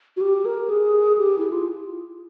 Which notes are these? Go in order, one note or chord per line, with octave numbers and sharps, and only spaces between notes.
F#4
G4
A#4
G#4
G4
E4
F4